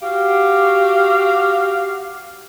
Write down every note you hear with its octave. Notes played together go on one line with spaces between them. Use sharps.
F#4 G4 F5